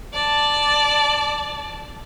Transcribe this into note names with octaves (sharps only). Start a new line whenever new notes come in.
D5 A5